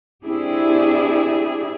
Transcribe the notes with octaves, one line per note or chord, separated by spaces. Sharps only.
C4 D4 E4 G4 G#4